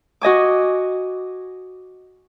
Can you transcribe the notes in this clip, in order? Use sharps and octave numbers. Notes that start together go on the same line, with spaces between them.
F#4 D#5 G#5 D6